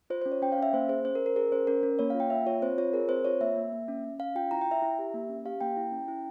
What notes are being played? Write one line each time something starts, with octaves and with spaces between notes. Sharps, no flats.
F4 C5
C#4 C5
C#5
C#4 G5
F5
C#4 E5
A#3 C5
G#4 C5
C#4 C5
A#4
C#4
A#4
G#4 A#4
C#4 C5
C#4 A#4
C#4
A#3 C#5
F4 F5
G5
A#3 E5
F4 C#5
C4 C5
F4 C#5
G#4 A#4
C4 C5
F4 C#5
A#3 E5
A#3
A#3
C#4
C#4
C#4 F5
F4 G5
E4 A#5
G5
E4
E5
E4
G4
A#3
C#4
G4 F5
A#3 G5
E4
C#4
E4